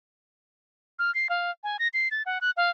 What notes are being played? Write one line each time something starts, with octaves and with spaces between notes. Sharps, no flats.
F6
C7
F5
G#5
A#6
C7
A6
F#5
F#6
F5